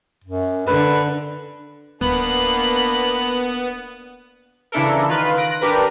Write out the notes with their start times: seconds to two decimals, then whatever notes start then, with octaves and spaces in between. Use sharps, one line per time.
0.24 F#2
0.67 D3 B4
2.01 D1 A#3 B3 D4 B5
4.72 C#3 E3 D4 E4 A4 A#4
5.08 D#3 F4 B4
5.37 F#6 A#6 D7
5.61 D4 G4 A#4 B4